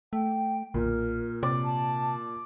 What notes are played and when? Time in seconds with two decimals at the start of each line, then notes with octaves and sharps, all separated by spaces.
0.13 A3 G5
0.74 B1 A#2 A#4
1.43 C3 D5
1.64 A5